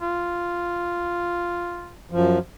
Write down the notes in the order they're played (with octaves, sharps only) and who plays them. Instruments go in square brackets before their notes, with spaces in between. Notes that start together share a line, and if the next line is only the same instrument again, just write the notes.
[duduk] F4
[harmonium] F#2 F3